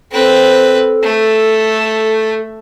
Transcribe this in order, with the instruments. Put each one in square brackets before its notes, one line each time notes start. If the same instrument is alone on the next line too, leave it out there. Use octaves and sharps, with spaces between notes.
[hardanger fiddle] C4 B4 [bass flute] A4
[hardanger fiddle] A3